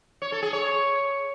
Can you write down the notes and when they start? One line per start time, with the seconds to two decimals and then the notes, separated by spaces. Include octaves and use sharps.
0.22 C#5
0.32 A4
0.43 G#4
0.53 C#5